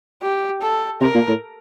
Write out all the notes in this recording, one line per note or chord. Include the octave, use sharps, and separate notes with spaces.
G4
A4
C3 A#4
A#2
A2